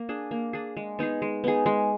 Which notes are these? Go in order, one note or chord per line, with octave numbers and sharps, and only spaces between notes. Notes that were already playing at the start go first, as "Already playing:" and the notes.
Already playing: A#3
D4 G#4
A#3
D4 G#4
G#3
B3 D#4 G#4
G#3
B3 D#4 G#4
G#3